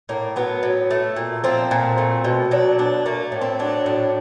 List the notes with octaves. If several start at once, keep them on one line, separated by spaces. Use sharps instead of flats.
A2 A#3
F#3 B3
A2
A3
A#2
F3 C4
A#2
A3
B2
F#3 D4
B2 D4
A3 A#3
A2
C4
F#3 D4
A2